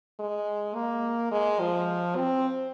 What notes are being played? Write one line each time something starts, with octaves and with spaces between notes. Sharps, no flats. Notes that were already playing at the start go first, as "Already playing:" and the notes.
G#3
A#3
G#3
F3
C4